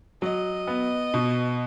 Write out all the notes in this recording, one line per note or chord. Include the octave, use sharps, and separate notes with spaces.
F#3 D#5
B3
B2